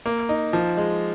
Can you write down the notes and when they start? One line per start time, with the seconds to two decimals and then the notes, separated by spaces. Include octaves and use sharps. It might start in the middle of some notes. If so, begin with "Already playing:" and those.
0.06 A#3
0.29 D#4
0.53 F3
0.77 G#3